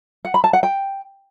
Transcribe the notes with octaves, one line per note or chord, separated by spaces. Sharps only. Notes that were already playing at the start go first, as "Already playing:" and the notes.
F#5
B5
A5
F#5
G5